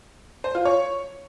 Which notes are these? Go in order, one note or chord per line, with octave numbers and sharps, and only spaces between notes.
C5
F4
C#5